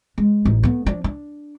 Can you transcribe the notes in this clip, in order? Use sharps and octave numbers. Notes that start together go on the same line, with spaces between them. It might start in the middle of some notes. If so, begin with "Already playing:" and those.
G#3
A1 D#4
A3 B3
F3 D4
D4